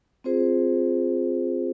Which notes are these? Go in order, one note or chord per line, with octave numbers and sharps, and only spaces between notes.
C4 F4 G#4 C5